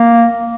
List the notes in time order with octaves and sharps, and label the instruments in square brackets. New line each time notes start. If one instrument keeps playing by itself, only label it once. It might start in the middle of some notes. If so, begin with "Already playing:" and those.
Already playing: [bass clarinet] A#3